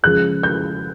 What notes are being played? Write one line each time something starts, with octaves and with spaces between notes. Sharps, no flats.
C#3 F3 G#3 F#6
G6